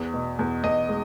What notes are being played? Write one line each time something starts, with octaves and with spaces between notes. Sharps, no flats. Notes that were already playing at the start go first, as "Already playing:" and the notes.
Already playing: E2
B2
E2
E2 D#5
G#3